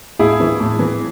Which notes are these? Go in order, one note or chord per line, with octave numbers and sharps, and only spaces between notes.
A2 E4 G#4
E3
A2
E3